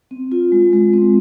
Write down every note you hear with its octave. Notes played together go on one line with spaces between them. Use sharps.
C4
F4
G#3
G#3
C4